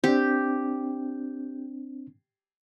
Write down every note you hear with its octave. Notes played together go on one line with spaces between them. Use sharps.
C4 D4 G4